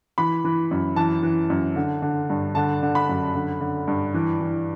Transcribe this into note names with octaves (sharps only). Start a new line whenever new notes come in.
E3 B5
E3
F#2
E3 A5
E3
F#2
D3
D3
G2
D3 A5
D3
B5
F#2
D3
D3
G2
E3
E3